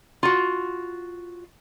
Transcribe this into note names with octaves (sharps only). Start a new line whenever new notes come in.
F4 F#4